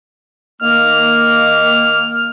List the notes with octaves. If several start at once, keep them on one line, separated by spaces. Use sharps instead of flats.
D#3 A#3 F6